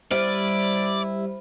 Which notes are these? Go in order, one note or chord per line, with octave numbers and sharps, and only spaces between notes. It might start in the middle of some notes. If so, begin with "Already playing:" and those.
G3 E4 C5 D5